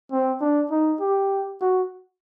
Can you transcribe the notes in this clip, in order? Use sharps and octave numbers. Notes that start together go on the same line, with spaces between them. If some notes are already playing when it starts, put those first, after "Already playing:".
C4
D4
D#4
G4
F#4